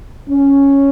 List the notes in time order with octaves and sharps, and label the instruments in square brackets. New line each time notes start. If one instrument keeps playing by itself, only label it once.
[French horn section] C#4